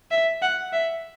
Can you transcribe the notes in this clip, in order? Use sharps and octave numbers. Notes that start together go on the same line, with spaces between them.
E5
F#5
E5